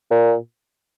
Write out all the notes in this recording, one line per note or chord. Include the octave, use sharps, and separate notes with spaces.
A#2